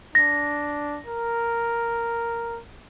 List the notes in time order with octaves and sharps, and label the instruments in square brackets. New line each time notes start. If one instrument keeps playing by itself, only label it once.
[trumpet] D4 [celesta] A#6
[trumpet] A#4